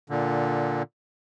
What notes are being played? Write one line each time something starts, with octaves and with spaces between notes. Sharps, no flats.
A#2 D3